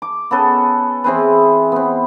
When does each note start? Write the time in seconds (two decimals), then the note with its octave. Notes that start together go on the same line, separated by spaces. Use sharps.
0.02 D6
0.31 B3 C#4 A4 B4
1.04 E3 C4 G#4 B4
1.72 B3 C4